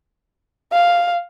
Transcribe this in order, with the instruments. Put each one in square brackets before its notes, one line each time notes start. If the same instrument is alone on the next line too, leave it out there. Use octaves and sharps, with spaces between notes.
[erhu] F5